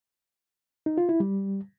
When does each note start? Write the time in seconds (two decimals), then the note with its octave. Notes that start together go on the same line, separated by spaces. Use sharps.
0.86 D#4
0.98 F4
1.09 E4
1.20 G3